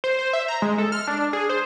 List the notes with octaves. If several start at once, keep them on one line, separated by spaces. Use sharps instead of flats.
C5
C5
E5
A#5
G#3
A4
F6
D4
G#4
C5